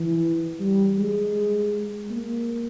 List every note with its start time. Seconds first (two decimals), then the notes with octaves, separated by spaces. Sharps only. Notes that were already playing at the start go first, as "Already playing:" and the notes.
Already playing: E3
0.61 G3
0.98 G#3
2.10 A#3